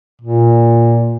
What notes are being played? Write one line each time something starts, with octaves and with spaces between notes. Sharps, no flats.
A#2